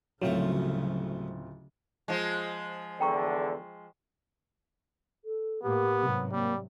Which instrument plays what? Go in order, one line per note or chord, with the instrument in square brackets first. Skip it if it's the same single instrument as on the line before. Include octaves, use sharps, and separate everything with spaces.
[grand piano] D1 C4 F4 [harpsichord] C2 F3 A3 [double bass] C#3 [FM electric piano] F#3
[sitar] F3 G#3
[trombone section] E2 D3 [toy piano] G5 A#5 C#6
[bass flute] A4
[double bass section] A2 A#3 [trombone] B3 [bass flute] G4
[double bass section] G#2 C3 F#3
[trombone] G3 [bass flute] A#3